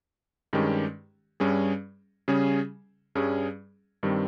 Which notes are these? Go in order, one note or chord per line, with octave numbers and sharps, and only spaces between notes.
G2 D#3 G#3 C#4 G4
G2 G3 C#4 G#4
C#3 G3 C#4 G#4
G2 G3 C#4 G#4
G2 D#3 G3 C4